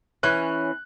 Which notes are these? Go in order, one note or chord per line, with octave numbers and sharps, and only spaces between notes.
E3 C#4 F#6